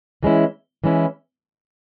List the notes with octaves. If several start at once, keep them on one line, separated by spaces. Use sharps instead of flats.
E3 G#3 C#4 E4
E3 G#3 C#4 E4